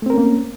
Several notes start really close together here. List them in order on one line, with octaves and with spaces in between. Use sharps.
A3 C4 A#4 C#4 A#3